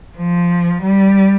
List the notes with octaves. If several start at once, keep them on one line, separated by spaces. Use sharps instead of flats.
F3
G3